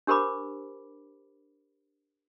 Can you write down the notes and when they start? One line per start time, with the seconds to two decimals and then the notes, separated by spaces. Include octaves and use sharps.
0.07 D4 G4 A#4 C5 B5 D6